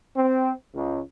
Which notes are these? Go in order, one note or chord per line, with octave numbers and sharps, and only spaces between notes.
C4
C#2